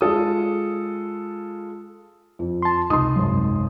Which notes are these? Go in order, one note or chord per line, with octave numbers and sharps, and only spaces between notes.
G#3 F4 A4 D#6
F2
A5 C6
C#2 C3 D#4 C6 D#6
G#1 F#2